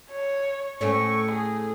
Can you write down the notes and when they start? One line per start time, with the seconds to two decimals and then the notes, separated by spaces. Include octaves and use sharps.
0.11 C#5
0.81 A2 A3 C#4 C#6
1.32 G#4